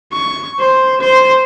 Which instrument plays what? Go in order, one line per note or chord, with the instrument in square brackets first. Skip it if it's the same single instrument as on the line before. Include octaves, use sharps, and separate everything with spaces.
[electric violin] C#6
C5
C5